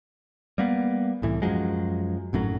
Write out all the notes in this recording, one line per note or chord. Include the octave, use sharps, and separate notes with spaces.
G3 A#3 B3
C2 A2 E3
F#2 F3 F#3 G#3
G#1 F#2 A2 F#3